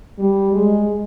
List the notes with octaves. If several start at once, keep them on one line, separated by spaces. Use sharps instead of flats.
G3
G#3